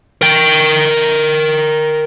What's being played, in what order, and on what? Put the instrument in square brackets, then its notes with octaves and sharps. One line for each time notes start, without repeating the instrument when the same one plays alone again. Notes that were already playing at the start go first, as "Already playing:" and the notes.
[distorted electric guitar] A#4 G5